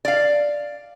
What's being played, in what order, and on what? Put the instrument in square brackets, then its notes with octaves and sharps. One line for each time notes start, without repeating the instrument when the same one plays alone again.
[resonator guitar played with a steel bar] D5 F5